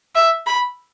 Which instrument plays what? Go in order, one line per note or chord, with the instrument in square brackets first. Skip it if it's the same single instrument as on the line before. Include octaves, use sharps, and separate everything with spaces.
[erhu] E5
B5